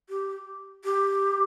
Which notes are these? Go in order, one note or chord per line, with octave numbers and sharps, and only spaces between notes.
G4
G4